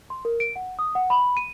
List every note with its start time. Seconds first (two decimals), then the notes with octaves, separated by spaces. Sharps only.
0.10 C6
0.25 A#4
0.40 D7
0.56 F#5
0.79 D#6
0.95 F#5
1.10 B5
1.37 D#7